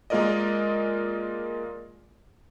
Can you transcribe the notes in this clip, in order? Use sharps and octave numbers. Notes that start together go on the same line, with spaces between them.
G#3 A#3 F4 A#4 D5 D#5